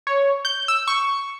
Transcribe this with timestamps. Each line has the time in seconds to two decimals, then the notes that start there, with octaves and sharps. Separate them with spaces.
0.07 C#5
0.45 G6
0.68 E6
0.87 C#6